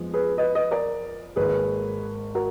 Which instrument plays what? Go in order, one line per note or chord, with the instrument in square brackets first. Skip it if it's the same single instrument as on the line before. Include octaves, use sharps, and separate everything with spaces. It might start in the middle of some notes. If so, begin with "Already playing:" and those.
Already playing: [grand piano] F2 F3 G#3 B3
[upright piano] G#4 B4
B4 D#5
B4 D#5
A#4 D5
[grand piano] G#1 G#2 D#3 A#3 [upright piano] G#4 B4
[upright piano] F#4 A#4